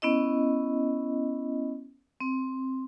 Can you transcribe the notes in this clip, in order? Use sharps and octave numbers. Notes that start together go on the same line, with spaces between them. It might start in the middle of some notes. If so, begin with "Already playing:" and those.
B3 C#4 E4 D#5
C4